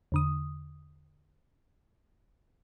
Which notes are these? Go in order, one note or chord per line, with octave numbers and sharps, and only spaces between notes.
E2 D3 D#6